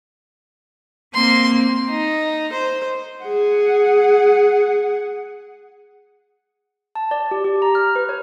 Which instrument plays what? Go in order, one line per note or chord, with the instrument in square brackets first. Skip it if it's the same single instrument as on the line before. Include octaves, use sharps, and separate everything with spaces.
[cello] A#3 C4 [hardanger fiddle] C6
[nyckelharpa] D#4
C5
[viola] G#4 F#5
[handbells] A5
D5
G4
G4
A#5
F6
B4
C#5